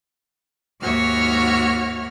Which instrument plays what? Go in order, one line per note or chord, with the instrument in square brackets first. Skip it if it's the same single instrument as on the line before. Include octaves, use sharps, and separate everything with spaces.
[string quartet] D#2 G#2 F#4 C#5 E5 F6